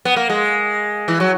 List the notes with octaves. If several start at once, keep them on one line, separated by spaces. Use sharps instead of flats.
B3
A#3
G#3
E3
F#3